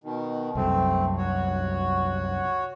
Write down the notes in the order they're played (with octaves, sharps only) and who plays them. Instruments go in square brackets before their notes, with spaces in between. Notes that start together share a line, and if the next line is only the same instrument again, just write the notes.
[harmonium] B2 D#3
[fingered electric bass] C2 F#2 [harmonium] A3 C4
[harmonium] F#4 C#5